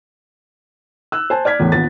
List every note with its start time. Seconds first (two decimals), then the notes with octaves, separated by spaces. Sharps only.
1.12 E6 F#6
1.30 C5 G#5 A5
1.45 D5 F6 G#6 B6
1.60 E2 A2 E3
1.72 A#1 D#2 B3 A6